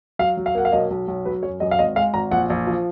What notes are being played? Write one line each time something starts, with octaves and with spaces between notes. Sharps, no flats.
F#3 F5
F#3
F5
A#3 F#5
F5
B1 D#5
B1
B1
F#3 B4
F#2 C#5
F#2 D#5
F5
G#1 D#5
G#3 F5
G#1 A#5
A#1 F#5
A#1
F3